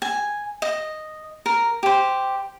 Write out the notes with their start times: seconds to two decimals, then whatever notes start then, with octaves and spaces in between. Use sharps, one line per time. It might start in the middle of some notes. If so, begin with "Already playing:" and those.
0.02 G#5
0.62 D#5
1.46 A#4
1.83 G4 C5